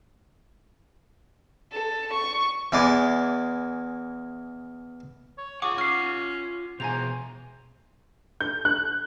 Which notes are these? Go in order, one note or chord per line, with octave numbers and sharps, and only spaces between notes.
A4
C#6
E2 E3 G#3 D5
C#5
F4 G#4 F#5 C#6 D6
C#4 C#6 D6 F6 C7
B2 G#4 C5 G#5 A#5 F7
G6
F#6